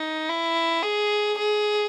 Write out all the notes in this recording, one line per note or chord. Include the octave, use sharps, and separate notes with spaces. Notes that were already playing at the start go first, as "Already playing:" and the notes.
Already playing: D#4
E4
G#4
G#4